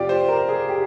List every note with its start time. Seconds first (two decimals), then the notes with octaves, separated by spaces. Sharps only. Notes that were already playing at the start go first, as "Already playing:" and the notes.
Already playing: C3 F3 F4 G4 D5
0.09 C5
0.29 A#4
0.49 G#4
0.69 G4